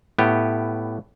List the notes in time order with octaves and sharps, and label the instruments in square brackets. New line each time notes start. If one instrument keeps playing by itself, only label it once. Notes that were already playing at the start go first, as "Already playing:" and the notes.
[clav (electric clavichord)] A2 B3 G4